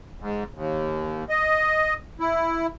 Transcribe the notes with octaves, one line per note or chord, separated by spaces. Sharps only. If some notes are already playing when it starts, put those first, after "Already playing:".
G#2
D#2
D#5
E4